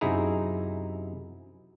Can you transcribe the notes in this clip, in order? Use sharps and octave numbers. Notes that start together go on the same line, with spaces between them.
F#2 C3 D#4 E4 G#4 A#5